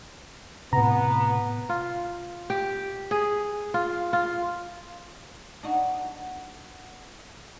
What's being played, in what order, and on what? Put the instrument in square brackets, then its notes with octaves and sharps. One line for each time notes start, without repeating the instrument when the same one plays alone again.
[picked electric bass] A2 C3 [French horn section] B3 [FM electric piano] A#5
[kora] F4
G4
G#4
F4
F4
[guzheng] D4 D#4 F#4